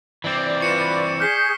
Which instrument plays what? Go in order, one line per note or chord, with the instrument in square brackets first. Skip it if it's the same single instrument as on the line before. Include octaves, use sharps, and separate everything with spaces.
[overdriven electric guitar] E3 C4 [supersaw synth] D5
[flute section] F4 B4 [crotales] C#6 C#7 E7
[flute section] G#4 G6 [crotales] F6 B6 C7